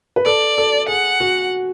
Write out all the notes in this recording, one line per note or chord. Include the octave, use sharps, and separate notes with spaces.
B4
A4 D5
A4
G#4 F#5
F#4